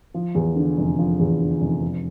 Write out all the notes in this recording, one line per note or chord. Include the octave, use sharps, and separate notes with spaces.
F3
E2
D3
F1
F3
E2
D3
F1
F3